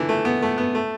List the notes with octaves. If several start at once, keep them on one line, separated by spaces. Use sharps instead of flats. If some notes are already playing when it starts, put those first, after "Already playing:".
Already playing: D3 E3
A3
B3
A3
B3
A3